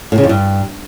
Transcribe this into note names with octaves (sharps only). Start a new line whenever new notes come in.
A2
C#3
F2
G2